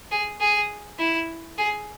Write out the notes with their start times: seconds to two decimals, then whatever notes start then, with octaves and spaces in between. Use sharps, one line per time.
0.11 G#4
0.41 G#4
0.99 E4
1.58 G#4